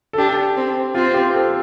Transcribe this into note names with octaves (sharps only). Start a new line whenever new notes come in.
A4
D4 G4
C4
C4 F4
G4
A4